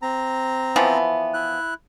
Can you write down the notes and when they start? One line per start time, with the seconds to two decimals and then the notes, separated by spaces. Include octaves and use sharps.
0.02 C4 A#5
0.76 E3 F3 B3
1.34 E4 F#6